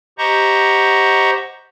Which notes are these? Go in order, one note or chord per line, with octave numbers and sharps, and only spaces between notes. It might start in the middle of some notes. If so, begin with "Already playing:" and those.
G4 C5 D#5 F#5 A#5 C#6